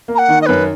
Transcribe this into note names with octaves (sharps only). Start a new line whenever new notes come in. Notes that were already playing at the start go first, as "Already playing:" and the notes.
A#3
A#5
F#5
D#3
D#5
F#2 B4